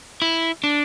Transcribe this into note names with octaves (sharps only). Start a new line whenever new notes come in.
E4
D4